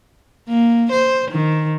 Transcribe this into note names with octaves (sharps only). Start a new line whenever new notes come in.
A#3
C5
D#3